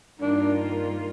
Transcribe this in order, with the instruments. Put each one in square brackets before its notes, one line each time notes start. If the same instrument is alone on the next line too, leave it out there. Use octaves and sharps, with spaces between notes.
[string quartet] G2 D#3 A#3 F4 [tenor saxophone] D4